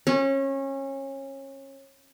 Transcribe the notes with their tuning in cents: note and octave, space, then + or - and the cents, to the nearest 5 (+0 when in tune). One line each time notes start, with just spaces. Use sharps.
C#4 -25